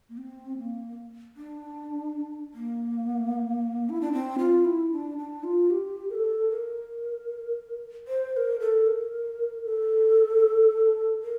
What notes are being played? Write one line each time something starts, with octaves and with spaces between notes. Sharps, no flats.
A#3
C4
A#3
D4
A#3
E4
D4
C4
F4
E4
D4
D4
F4
G4
A#4
A4
A#4
C5
C5
A#4
A4
A#4
A4
A#4